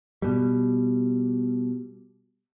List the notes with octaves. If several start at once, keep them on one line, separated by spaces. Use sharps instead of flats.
B2 G3